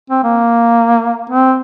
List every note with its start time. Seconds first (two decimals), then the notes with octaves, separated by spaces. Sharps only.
0.10 C4
0.24 A#3
1.30 C4